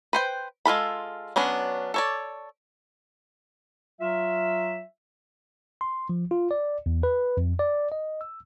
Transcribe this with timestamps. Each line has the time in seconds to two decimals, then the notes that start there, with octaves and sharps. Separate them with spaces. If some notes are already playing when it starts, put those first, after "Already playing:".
0.13 B4 C5 G5
0.65 G#3 F4 A4 B5
1.36 F#3 B3 C#4 D4
1.94 A4 C#5 D5
4.00 F#3 F4 E5
5.81 C6
6.09 F3
6.31 F4
6.51 D5
6.86 E2
7.03 B4
7.37 F2
7.59 D5
7.92 D#5
8.21 E6